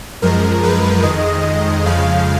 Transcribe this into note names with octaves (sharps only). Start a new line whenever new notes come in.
F#2 F3 G#3 A#4
B4
F2 D#3 G#3 D#5
F2 C#3 F3 G#3 F5